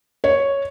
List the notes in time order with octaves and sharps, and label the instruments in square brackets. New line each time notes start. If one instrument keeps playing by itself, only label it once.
[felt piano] C#5